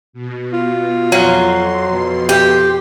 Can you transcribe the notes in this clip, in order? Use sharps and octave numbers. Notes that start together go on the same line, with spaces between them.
B2
F4
F2 F#3 C6
B2
G4